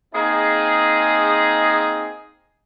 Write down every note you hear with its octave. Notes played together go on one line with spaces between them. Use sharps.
A#3 C4 D#4 G#4